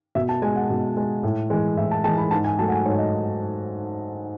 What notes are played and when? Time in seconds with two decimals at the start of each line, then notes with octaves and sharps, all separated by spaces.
0.15 B2 E5
0.29 A5
0.42 G#3 G#5
0.56 F#5
0.70 B2
0.97 G#3
1.23 A2
1.50 E3 G#3
1.77 A2 E5
1.91 A5
2.04 E3 G#3 A5
2.18 B5
2.31 G#2 A5
2.44 G#5
2.58 F#3 A3 A5
2.68 F#5
2.72 G#5
2.85 G#2 C#5
2.99 D#5